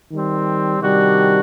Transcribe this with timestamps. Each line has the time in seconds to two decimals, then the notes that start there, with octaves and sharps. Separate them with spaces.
0.12 D#3 G3 C4
0.81 C3 D#3 G3 D4 F#4